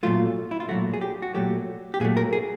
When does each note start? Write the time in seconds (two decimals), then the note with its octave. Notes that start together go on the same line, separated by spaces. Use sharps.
0.03 A#2 F#3 A3 F4
0.51 E4
0.60 F4
0.69 A#2 F#3 A3 F#4
0.94 G#4
1.01 G4
1.22 F#4
1.34 A#2 F#3 A3 G4
1.94 G4
2.00 A#2 F#3 A3 G#4
2.17 A#4
2.33 G#4